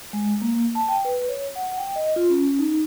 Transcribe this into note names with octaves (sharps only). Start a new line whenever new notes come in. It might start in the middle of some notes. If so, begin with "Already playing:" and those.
G#3
A#3
A5
G5
B4
C#5
F#5
G5
D#5
F4
C#4
D#4